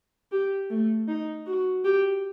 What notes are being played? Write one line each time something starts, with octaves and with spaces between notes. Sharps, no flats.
G4
A3
D#4
F#4
G4